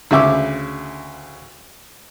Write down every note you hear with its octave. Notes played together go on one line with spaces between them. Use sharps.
D2 C#3 E5 D6